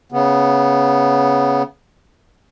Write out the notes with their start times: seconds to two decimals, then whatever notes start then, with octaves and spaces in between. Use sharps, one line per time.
0.12 C#3 B3